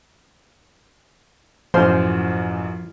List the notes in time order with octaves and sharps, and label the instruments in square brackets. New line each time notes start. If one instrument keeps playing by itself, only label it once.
[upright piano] A1 F#2 F6 [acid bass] F3 [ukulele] C5